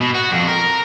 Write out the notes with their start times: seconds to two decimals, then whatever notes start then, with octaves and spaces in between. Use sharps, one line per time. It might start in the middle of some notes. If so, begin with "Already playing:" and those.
0.01 B2
0.15 F#4
0.32 F2
0.48 A#4